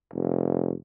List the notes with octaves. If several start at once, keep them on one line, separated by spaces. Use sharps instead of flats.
F1